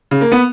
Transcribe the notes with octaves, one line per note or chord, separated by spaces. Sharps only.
C#3
A#3
B3